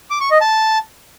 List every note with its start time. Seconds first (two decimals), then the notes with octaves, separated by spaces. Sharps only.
0.10 D6
0.21 C#6
0.31 D#5
0.41 A5